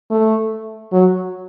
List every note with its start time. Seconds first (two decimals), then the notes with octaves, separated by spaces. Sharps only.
0.11 A3
0.92 F#3